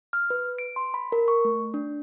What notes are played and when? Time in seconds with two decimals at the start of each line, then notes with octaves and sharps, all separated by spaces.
0.13 F6
0.30 B4
0.58 D7
0.76 C6
0.94 B5
1.12 A#4
1.28 C#6
1.45 A3
1.74 D4